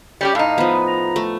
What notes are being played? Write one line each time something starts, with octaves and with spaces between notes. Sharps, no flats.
G3 C#4 G4
A2 D#4 F5
F3 B3
A#5
A3